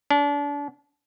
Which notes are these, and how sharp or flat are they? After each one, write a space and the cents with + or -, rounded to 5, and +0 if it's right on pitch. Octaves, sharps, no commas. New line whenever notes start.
D4 -35